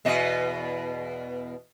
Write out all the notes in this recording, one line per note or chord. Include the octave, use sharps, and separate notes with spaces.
E2 B2 D#5